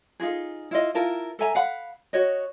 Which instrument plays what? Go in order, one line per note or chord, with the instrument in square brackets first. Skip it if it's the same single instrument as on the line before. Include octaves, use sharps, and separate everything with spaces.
[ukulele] D#4 F4 F#4 G#4
E4 F4 D#5
E4 F4 A#4 A5
A4 E5 G#5 A#5
F5 F#5 B5
F#4 C#5 D#5